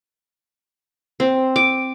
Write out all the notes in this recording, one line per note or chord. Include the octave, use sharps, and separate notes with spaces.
C4
D6